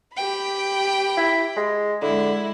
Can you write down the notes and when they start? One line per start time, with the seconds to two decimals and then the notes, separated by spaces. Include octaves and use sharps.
0.16 G4 G5 B5
1.17 E4
1.57 G#3
2.02 D3 G#3 E4